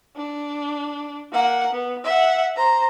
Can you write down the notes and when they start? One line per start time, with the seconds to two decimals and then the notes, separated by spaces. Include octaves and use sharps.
0.16 D4
1.32 A#3 F#5
1.72 B3
2.04 E5 F#5
2.56 C5 A#5